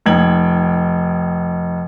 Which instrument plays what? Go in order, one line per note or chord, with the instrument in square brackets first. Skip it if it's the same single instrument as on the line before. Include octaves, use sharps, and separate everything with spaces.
[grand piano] F1 D#4 G5 G#6 F#7